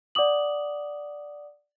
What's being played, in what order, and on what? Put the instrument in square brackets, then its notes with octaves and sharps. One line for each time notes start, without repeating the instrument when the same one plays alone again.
[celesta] D5 F#5 D6 D#6 F#7